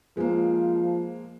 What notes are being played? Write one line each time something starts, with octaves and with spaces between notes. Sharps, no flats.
F3 G#3 A#3